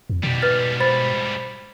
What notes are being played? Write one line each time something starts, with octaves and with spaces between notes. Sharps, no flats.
F2
G#2 B2 G3
B4 F6 A6
C5 B5 A6